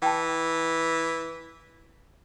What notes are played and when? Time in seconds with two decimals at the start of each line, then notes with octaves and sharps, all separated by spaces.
0.02 E3 G5 A5